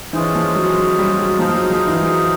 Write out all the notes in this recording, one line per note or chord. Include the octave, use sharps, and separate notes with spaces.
E3 G#3 C#4 F4 G#4 C5
F3
F#3
F#3
G3
F#3
F3 D#4 G#4 C5 F5
F3
F#3
F3
E3
F#3